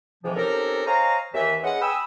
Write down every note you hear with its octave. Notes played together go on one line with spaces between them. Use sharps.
F2 G#2 C3 E3 F3
C4 C#4 D#4 G4 A4 A#4
C5 C#5 D#5 F5 G#5 A#5
D#2 E3 E5
C#4 G#4 B4 D#5 F#5
G5 G#5 B5 D#6 E6